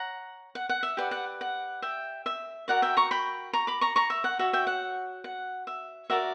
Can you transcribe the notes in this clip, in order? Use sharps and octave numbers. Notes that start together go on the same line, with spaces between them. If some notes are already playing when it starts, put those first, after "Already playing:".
Already playing: C#5 F#5 A#5
F#5
F#5
E5
G4 B4 D5 F#5
F#5
F#5
E5 G5
E5
F#4 A#4 D5 F#5
E5 G5
A#5 C#6
G5 B5
A#5 C#6
B5 D6
A#5 C#6
A#5 C#6
E5
F#5
F#4 C#5 E5
E5 G5
F#5
F#5
E5
F#4 A#4 D5 E5